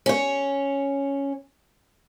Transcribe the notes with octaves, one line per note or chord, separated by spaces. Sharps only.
C#4 C#5